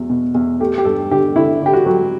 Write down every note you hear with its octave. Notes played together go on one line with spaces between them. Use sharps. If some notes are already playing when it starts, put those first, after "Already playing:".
Already playing: E2 F#3
B2
E2
A3 G4
G4
G2 A4
D3 G4
D3 E4
D3 G4
F#4
F#3